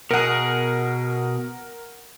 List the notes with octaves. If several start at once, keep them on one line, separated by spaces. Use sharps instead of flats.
B2 G#4 A#4 F#5